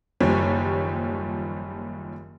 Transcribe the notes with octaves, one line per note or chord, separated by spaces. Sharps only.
F#1 D#2 F3 G3 C#5